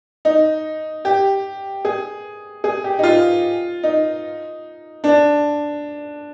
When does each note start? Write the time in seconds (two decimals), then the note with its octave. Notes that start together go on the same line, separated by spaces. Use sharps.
0.25 D#4
1.05 G4
1.85 G#4
2.64 G#4
2.84 G4
2.99 D#4
3.03 F4
3.83 D#4
5.04 D4